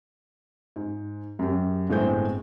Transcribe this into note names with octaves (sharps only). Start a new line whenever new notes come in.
G#2
F#2 G4
G1 A2 G#3 C4 C5 G6